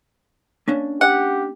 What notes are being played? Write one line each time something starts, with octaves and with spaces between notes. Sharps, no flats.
A#3 C#4 D4
G4 F#5